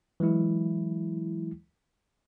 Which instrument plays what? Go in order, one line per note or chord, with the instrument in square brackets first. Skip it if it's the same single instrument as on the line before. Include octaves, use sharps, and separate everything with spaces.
[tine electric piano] E3 F#3 G#3 E4